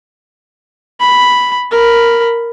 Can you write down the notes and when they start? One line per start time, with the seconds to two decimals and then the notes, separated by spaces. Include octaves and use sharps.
1.00 B5
1.71 A#4 B5